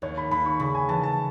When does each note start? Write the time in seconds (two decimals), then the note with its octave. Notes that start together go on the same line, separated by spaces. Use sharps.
0.02 D#2 C#5
0.17 B5
0.31 D#2 B5
0.46 C#6
0.59 C#3 B5
0.75 G#5
0.89 E3 A5
1.03 A5